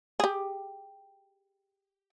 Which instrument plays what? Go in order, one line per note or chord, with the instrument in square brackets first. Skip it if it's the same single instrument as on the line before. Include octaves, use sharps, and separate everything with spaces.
[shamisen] G4 G#4